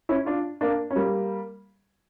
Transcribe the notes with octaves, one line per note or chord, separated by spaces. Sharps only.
C#4 E4
D4 F4
A#3 D4
C#4
G3 A#3